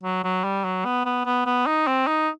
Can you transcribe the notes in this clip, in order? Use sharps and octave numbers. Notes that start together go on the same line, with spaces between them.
F#3
F#3
G3
F#3
B3
B3
B3
B3
D#4
C4
D#4